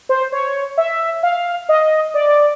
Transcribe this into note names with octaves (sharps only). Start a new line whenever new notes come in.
C5
C#5
E5
F5
D#5
D5